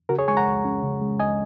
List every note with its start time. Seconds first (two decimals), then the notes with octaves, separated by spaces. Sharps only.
0.09 C#3 F#4 A#4
0.18 G#4 C#5
0.28 G#3 G#5 C#6
0.37 F#5 A#5
0.46 C#2
0.65 C#4
0.83 C#3
1.02 G#3
1.19 C#2 D#5 G#5